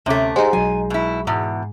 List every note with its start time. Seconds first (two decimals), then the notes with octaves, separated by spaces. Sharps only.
0.06 D2 C3 A3 C#4 D6
0.36 G#3 D#4 G4 C5 F#5
0.53 B1 F#3 G#5
0.90 B2 E4
1.27 E2 G#2 B2